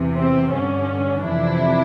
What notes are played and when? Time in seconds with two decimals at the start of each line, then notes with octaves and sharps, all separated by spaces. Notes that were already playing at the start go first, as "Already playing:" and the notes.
Already playing: E2 C3 E3
0.15 C4
0.51 G2 D3 C#4
1.23 F2 C3 E3 D4 E4